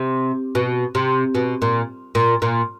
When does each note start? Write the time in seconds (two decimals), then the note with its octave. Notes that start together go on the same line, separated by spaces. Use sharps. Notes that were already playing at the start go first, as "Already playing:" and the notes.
Already playing: C3
0.55 B2
0.95 C3
1.35 B2
1.62 A#2
2.15 A#2
2.42 A#2